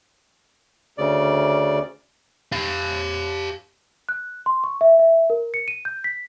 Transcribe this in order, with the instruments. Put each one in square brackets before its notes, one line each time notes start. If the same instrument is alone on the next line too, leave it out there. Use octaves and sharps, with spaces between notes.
[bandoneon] D2 C#3 D5
[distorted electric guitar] G4 F5
[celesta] F#6
C6
C#6
E5
E5
A#4
C#7
D#7
G6
B6